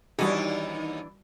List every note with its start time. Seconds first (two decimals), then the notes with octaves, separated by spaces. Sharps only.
0.19 D#2 E3 G3 D4 D#4 F#4 G#4